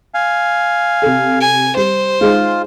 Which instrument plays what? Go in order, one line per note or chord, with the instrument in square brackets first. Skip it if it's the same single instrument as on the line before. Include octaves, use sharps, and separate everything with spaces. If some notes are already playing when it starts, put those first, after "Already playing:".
[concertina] F5 G#5
[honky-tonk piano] C3 A4
[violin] G#5
[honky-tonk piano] G3 [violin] C5
[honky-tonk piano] G#3 D#4 G#4 [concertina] F4